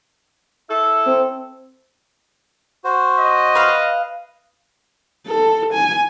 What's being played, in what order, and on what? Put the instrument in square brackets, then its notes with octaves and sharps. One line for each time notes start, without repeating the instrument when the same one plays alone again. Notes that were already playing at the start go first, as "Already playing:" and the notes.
[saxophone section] E4 A4
[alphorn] C4
[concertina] F#4 C5
[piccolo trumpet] D#5
[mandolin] B4 F5
[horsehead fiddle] A4
G#5